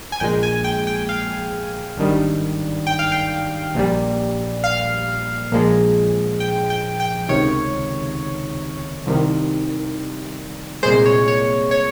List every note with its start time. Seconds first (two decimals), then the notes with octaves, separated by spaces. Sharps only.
0.12 G#5
0.20 A#1 A#2 G#3 G5
0.43 G#5
0.64 G5
0.87 G5
1.09 F5
1.97 G#1 G2 D#3 G3
2.87 G5
2.99 F5
3.12 G5
3.75 A#1 A#2 G3
4.64 F5
5.52 A#1 A#2 F3 G#3
6.40 G5
6.70 G5
7.00 G5
7.29 C#2 C3 D#3 C#5
9.06 C2 C3 D#3
10.83 G#3 C5
10.85 C2 A#2
11.06 C#5
11.28 C#5
11.71 C#5